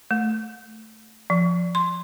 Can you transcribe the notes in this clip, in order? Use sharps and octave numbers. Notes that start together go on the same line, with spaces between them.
A3
F3
C6